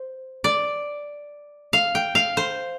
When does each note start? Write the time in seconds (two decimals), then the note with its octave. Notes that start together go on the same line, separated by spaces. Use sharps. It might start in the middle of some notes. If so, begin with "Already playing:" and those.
Already playing: C5
0.44 D5
1.73 F5
1.95 G5
2.15 F5
2.37 C5